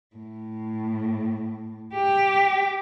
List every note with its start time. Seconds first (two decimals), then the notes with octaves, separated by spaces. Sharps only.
0.16 A2
1.94 G4